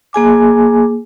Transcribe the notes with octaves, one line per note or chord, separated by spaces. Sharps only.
A#3 G#4 G#5 D6